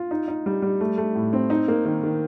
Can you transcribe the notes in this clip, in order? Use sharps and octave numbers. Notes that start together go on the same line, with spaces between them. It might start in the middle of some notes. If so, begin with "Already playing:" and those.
Already playing: F4
D#4
D#4
G3
G3
A3
A3
A2
C4
D#4
A#3
D#3
D#3